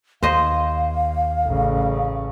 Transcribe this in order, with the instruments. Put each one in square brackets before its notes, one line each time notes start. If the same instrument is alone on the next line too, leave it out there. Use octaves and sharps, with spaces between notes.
[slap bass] D#2 [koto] C5 D#5 [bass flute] F5
[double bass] A1 C#3